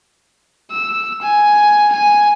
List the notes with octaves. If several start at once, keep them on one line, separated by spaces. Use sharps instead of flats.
E6
G#5
G#5